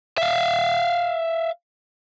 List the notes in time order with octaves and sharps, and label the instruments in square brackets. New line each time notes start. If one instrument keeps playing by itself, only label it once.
[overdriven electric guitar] E5 F5